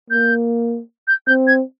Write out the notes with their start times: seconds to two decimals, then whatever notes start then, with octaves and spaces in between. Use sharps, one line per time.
0.10 A#3 G6
1.08 G6
1.27 C4 G6
1.47 G#6